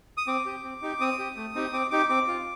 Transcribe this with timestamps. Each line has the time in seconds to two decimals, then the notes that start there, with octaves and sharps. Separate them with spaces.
0.17 D#6
0.27 C4 D6
0.46 G4
0.64 C4
0.82 D#4 G4
1.00 C4 D#6
1.19 G4
1.36 A3
1.55 C4 D#4 G4
1.73 C4 D6
1.91 D#4 G4 D6
2.09 C4 D6
2.28 F4